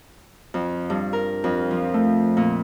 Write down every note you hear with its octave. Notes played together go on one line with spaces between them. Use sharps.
F2
G2
A#4
F2
F3
A3
A#2